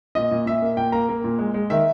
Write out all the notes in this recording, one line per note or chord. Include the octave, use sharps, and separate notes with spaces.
A#2 D#5
A#2
A#2 E5
A#3
A#2 G5
A#3 A#5
A#3
A#2
G#3
G#3
D#3 E5